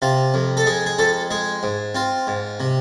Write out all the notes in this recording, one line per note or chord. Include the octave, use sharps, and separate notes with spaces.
C3 F4
F2
A4
G#3 G#4
G#4
F2 A4
G#3 G#4
G#2
C4 F4
G#2
C3